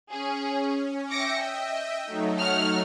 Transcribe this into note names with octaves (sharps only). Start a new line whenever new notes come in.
C#4 G#4
E5 G5 D6 A#6 C#7
D#5
F#3 A3 D#4
C#5 F#5 F6